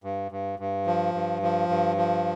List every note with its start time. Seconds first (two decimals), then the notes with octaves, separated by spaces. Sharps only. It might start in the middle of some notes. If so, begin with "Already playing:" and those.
0.04 G2
0.32 G2
0.59 G2
0.86 F3
1.15 G2
1.42 F3
1.69 G2
1.97 F3